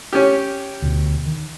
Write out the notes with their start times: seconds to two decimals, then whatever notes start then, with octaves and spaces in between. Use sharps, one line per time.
0.13 C#4 G4
0.82 D2 B2
1.26 D#3